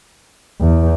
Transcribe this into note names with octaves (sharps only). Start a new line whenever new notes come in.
E2